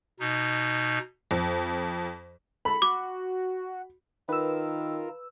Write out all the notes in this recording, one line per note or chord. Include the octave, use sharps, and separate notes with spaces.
B2 D#4
F2
A4 B5
F#4 D6
D#3 F4 A#4 B4 E6